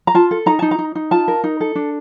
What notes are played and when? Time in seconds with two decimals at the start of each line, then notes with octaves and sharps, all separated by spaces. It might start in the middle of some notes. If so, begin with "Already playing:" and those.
0.07 A#5
0.15 F4 A5
0.31 A4
0.46 D#4 A#5
0.59 D#4 A5
0.71 A#5
0.79 D#4
0.95 D#4
1.11 F4 A5
1.28 A#4
1.44 D#4
1.61 A4
1.75 D4